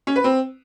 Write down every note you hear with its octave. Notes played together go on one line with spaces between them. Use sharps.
C#4
B4
C4